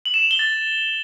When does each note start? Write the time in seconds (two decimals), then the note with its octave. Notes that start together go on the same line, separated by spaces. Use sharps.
0.05 F#7
0.14 E7
0.22 F7
0.31 G7
0.39 A6